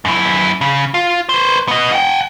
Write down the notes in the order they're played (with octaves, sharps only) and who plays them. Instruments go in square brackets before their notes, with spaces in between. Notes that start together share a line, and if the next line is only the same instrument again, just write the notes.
[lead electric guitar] F#2 E4
C#3
F4
B4 C5
B3 D#5
F#5 G5